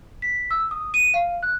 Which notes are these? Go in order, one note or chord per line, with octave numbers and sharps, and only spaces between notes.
B6
E6
D#6
D#7
F5
F#6